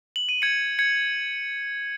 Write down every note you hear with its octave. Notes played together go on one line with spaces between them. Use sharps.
F#7
D#7
G#6 C#7
G#6 C#7